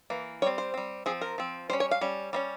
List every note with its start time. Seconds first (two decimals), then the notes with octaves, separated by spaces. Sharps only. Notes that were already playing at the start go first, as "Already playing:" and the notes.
0.10 E3 A#3
0.42 G3 C4 C#5
0.58 C5
0.74 G3 C4
1.06 F3 C4 G#4
1.21 A#4
1.38 F3 C4
1.70 G3 C#4 C5
1.80 C#5
1.91 F5
2.01 G3 C#4
2.33 G3 A#3 C#4